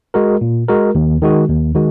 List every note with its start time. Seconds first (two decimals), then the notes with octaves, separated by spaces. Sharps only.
0.14 G#3 F#4 A#4
0.41 A#2
0.68 G#3 F#4 A#4
0.95 D#2
1.22 D#3 G#3 F#4
1.49 D#2
1.75 D#3 G#3 F#4